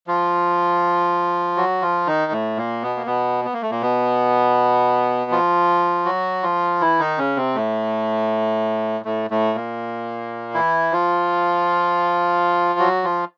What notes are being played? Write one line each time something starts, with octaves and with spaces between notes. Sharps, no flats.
F3 F4
F#3 F#4
F3 F4
D#3 D#4
A2 A3
A#2 A#3
B2 B3
A#3
B2 B3
B3
A#3
A3
A#2 A#3
B2 B3
F3 F4
F#3 F#4
F3 F4
E3 E4
D#3 D#4
C#3 C#4
C3 C4
A2 A3
A2 A3
A2 A3
A#2 A#3
E3 E4
F3 F4
F#3 F#4
F3 F4